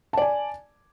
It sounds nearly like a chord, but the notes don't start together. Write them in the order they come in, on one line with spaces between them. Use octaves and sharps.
A5 D5 G#5